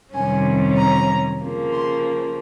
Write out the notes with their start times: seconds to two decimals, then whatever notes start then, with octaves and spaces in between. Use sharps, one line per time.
0.13 F2 C3 D#3 G3 C#4 G#5
0.77 A#5
1.40 C#3 F3 A#3
1.72 C6